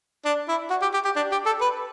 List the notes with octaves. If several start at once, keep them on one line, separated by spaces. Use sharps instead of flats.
D4
E4
F#4
G4
G4
G4
D4
G4
A4
B4